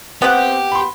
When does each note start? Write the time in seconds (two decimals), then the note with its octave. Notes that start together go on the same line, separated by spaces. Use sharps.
0.22 B3 C4 G4 F#5
0.72 B5 C6